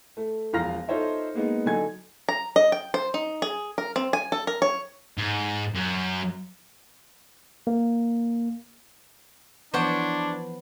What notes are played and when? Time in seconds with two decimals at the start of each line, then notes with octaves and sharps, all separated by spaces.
0.17 A3
0.53 E1 F3 F5 A#5 F6 A#6
0.88 D#4 F4 A4 C5 C#5 E5
1.34 G#3 A#3 B3 D#4
1.66 D3 F#3 D#4 G#5 G#6
2.29 A#5
2.56 D#5
2.72 G5
2.94 C5
3.14 D#4
3.42 G#4
3.78 A#4
3.96 C4
4.13 G#5
4.32 A4
4.47 A#4
4.62 C#5
5.18 G#2
5.75 F#2
7.67 A#3
9.74 E3 F3 B3 D4 C5 C#5 F#5